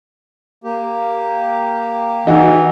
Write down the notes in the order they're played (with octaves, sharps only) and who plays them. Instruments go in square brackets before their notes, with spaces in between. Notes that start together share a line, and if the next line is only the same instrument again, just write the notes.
[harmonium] A#3 G4
[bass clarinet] E3 [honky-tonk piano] D#4 F#4